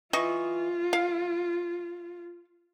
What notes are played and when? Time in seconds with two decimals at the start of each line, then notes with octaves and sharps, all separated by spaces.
0.13 E3 F4 D#5 C#6
0.93 F5